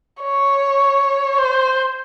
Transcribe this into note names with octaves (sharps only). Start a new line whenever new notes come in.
C#5
C5